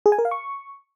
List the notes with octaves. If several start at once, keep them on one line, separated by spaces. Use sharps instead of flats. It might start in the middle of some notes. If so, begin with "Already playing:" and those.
G#4
G#5
A#4
F5
C#6